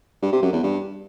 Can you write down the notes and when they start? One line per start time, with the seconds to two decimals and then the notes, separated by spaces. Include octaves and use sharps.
0.22 G2
0.33 C3
0.43 F#2
0.53 E2
0.63 G2